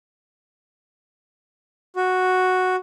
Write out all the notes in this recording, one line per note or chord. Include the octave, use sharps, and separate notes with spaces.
F#4